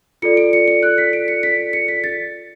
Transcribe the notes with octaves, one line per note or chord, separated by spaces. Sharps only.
F4 A4 D5 C#7
D7
C#7
C#7
F#6
B6
D7
C#7
B6
C#7
B6
A6